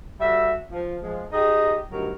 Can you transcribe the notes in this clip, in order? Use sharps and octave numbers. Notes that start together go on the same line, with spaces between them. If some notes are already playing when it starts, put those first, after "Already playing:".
G3 F#4 A4 E5
F3
F3 G#3
D#4 G4 G#4 D#5
D2 G2 D#3 F#3 G4 A#4